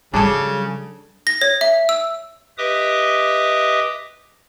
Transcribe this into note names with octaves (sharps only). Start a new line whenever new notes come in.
C#3 F#3 G3 D4 A4
A#6
C#5
E5
E6
G4 B4 D#5 E5 D6 D#6